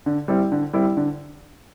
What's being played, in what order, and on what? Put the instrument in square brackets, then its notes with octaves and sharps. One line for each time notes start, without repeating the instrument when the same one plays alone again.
[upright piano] D3
G3 C4 E4
D3
G3 C4 E4
D3